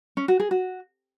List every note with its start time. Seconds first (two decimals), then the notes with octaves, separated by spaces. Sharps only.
0.17 C#4
0.28 F#4
0.40 G#4
0.51 F#4